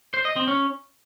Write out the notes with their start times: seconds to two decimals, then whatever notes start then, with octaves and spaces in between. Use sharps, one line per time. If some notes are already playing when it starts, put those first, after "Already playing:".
0.14 C5
0.25 D#5
0.36 C4
0.48 C#4